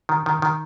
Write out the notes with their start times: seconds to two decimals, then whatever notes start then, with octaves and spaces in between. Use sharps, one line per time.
0.09 D#3
0.26 D#3
0.42 D#3